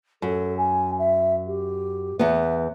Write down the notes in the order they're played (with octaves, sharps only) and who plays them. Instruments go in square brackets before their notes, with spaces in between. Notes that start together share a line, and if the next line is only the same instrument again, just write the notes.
[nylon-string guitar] F#2 [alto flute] A4
[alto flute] G#5
E5
G4
[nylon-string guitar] E2 B3 [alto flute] E5